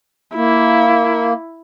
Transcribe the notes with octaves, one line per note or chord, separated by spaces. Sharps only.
A#3 E4